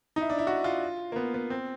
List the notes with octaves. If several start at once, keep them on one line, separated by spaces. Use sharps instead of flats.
D#4
E4
D4
E4
F#4
F4
A#3
B3
B3
C4